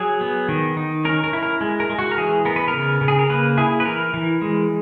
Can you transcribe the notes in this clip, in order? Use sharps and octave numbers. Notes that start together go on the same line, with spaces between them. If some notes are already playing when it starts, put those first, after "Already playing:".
Already playing: F#3 G#4
B3
D#3
D#4
C#4 A#4
A#4
E4
A#4
G#3
A#4
G#3
F#4
A#4
E3 G#4
B3 A#4
B4
A#4
C#3
C#3
G#4
A#4
A#3 B4
E4 G#4
B4
E3 A#4
E3
G#3